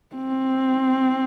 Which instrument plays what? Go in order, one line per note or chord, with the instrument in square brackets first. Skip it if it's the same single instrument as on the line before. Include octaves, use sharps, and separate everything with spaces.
[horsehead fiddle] C4